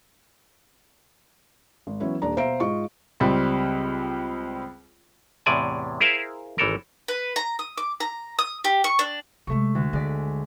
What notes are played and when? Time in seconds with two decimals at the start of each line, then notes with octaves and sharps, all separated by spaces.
1.87 G#1
2.00 E3 F#3 B3 C#4 E4
2.22 D#1 D4 D5 A#5
2.37 B2 C5 E5 F5 A#5 D7
2.60 G#2 G#3 F4 D#5 C#6
3.20 C#2 G3 C4
5.46 E2 A2 C3 D5 G#5
6.00 E4 G#4 A#4 C5 E5 F5
6.58 G#1 E3 A4 A#4
7.08 B4
7.36 A#5
7.59 D#6
7.78 D6
8.00 A#5
8.39 D#6
8.64 G4
8.84 C#6
8.99 D4
9.47 C3 G#3 A3 C#6
9.75 D2
9.93 D3 G#3 D5 B6